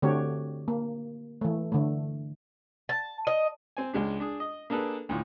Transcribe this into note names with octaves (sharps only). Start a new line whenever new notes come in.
D3 A3 C4 F#4 G4 C#5
A#3
E3 A3
D3 A3
A5
D#5
C4 G#5
C#2 G#3 D4
D4 G#4
D#5
A#3 D4 G#4 A4 B4
D2 A2 F4